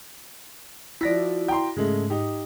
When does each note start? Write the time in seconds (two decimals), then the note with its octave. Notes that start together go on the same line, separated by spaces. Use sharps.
1.01 F3 E4 F#4 D5 A#6 B6
1.48 G5 A#5 C6
1.76 G#2 C#3 G#3 A3
2.10 D#4 G4